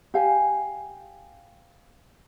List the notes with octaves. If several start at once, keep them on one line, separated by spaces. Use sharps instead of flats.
G4 F5 G#5